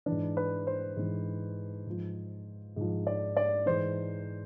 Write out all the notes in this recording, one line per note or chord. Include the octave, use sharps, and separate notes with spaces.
E3 D4
G#2
B4
C5
G#2 E3
G#2 F3
G#2 F3
D5
D5
G#2 E3 C5